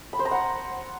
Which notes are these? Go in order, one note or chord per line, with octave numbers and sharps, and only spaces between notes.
B5
C5
A#5
F#5